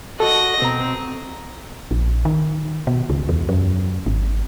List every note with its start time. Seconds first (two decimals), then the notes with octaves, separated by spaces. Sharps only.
0.20 F#4 A4 D#5 A#6
0.62 B2 C4 A#5
1.91 A#1
2.25 D#3
2.87 B2
3.10 C#2
3.29 E2
3.49 F#2
4.06 G#1